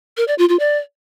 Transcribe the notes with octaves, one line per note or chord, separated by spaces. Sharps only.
A#4
D5
F4
F4
D5